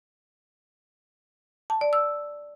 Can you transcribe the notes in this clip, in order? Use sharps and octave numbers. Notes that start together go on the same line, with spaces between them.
A5
D5
E6